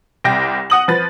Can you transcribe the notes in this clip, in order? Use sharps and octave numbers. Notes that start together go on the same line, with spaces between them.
C2 G5 A#6
F#5 D#6 F#7
F3 B4 A6